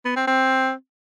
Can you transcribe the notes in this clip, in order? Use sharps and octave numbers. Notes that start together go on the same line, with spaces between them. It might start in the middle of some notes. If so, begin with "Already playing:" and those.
B3
C4
C4